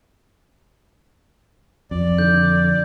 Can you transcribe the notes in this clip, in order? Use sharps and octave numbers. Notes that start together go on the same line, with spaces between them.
F2 D5
D3 G6